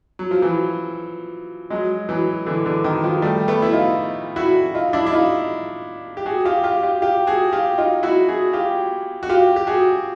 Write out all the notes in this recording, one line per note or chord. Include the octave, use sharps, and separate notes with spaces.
F#3
F3
E3 F#3
F#3 G#3
E3 F#3
D3 E3
D3 E3
D#3
D#3 F3
G3 A3
A3 B3
E4
D#4 F4
E4 F#4
D#4 F4
D4 E4
E4
D#4 F4
G4
F#4 G#4
F4 G4
F4 G4
F4 G4
F4 G4
F#4 G#4
F4 G4
D#4 F4
E4 F#4
F#4 G#4
F4 G4
F#4
F4 G4
G4
F#4 G#4